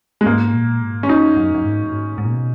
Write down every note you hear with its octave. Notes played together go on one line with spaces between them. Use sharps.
G#3
G#2 A#3
A#2
G#2
C#4
F#2 D#4
F#2
F#2
G#2
F#2
G#2
G#2
A#2
B2